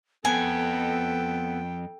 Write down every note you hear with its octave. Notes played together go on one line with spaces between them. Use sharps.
F2 B3 A4 G5 G#5